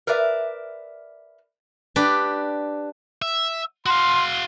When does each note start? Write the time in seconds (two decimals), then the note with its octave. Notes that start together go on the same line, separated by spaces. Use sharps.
0.07 A#4 B4 D5 E5
1.96 D4 G4 B4 D5
3.22 E5
3.86 F#4 F5 C6